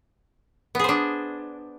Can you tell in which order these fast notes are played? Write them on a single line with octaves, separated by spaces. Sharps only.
B3 G#4 C5 D4